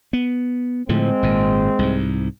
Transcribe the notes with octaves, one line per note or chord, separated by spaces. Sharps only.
B3
A2 D3 F3 G#3 C4
G#1 A#2
C2 G#2